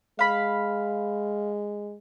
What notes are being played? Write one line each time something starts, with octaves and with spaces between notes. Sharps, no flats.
G#3 F5 B5